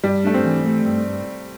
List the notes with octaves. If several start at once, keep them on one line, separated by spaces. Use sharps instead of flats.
G2 G3
A3 D4
C4
E3
A3
G2